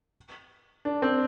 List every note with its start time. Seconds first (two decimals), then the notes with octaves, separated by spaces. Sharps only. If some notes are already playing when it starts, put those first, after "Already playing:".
0.85 D4
1.02 C4